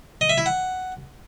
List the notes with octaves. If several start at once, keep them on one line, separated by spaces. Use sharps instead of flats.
D#5
E5
E4
F#5